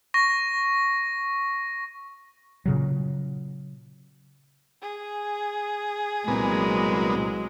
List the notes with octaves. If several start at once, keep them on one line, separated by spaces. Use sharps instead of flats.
C#6 A#6
A#2 C#3 F#3
G#4
C2 A#2 F#3 G#3 B3